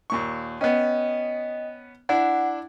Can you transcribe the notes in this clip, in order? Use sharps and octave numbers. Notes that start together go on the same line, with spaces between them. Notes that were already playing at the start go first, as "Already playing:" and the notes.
D#2 A#2 C#6
B3 C#4 D#5 G5
D4 E4 F#5